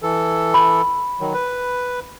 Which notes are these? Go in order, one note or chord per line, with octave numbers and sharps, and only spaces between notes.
E3 A4
B5
D#3 F#3
B4